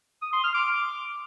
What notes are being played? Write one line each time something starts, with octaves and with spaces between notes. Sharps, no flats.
D#6
C6
F6
D6